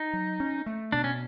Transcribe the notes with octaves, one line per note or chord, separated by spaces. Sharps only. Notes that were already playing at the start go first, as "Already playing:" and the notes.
Already playing: D#4
F#3
C#4
A3
B2 D4
C#4